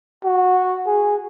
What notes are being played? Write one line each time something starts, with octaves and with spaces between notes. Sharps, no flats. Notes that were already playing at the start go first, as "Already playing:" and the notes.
F#4
G#4